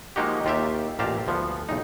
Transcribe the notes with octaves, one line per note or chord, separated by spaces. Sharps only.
F3 G#3 A#3 D#4 F#4 G4
D#2 F4 G4 E5
A1 A#2 G4 F5 A5 A#5
D2 F3 B3
B1 E2 D#4